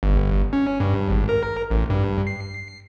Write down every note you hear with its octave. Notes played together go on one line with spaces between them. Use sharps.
G1
C#4
G2
G#1
A#4
A1
G2
C7